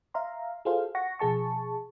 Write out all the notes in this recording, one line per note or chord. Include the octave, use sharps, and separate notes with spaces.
E5 F5 A#5 C6
F4 F#4 G#4 A4 C5 F5
F#5 C#6 A#6
B2 F3 G#4 A5 C#6